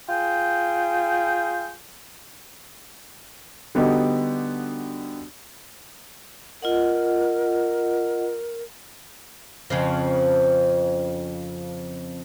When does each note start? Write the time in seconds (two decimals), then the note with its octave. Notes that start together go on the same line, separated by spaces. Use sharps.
0.09 F4 G#4 G5
3.75 D3 G3 B3 D#4 F#4 G4
6.62 F4 A#4 D#5 F#5
9.70 F2 C#3 F3